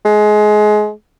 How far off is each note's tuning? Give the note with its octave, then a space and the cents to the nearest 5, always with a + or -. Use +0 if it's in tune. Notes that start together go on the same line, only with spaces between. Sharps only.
G#3 +25